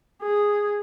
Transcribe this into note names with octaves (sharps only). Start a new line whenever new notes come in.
G#4